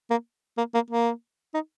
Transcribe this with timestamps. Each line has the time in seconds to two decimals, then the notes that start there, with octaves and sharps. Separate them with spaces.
0.11 A#3
0.58 A#3
0.74 A#3
0.91 A#3
1.54 D#4